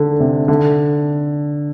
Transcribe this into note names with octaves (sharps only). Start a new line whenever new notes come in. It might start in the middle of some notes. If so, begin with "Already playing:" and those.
Already playing: D3
C3
D3